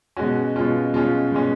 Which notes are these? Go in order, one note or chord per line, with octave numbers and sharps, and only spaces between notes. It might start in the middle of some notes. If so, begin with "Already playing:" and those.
B2 G#3 C#4 F#4
B2 G#3 C#4 F4
B2 G#3 C#4 F4
B2 G#3 C#4